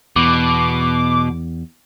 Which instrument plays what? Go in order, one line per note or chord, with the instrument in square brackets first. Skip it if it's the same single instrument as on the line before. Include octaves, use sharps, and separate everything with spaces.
[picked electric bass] E2 [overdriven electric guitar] B2 [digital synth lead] D6